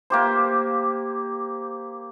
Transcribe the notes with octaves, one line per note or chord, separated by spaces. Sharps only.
A#3 G4 C5